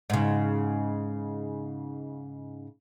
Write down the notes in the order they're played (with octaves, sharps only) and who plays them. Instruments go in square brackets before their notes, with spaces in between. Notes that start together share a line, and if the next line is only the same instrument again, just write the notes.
[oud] G#2 C#3